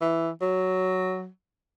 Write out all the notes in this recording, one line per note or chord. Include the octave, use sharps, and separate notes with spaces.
E3
F#3